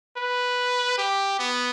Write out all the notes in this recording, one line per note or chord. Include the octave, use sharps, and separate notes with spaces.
B4
G4
B3